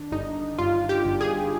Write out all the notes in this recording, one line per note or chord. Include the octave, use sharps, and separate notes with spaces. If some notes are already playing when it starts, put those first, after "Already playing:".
Already playing: D#3 D4
G1 D#4
G2 F4
G4
G1
G#4